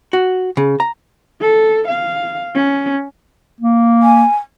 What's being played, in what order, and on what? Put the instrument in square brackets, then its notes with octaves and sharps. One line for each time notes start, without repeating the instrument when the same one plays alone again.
[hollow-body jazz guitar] F#4
C#3
A#5
[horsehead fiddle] A4
F5
C#4
[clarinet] A#3
[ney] G#5